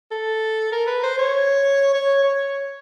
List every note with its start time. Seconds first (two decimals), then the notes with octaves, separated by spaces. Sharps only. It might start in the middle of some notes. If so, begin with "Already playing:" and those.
0.11 A4
0.72 A#4
0.87 B4
1.03 C5
1.18 C#5
1.94 C#5
2.24 C#5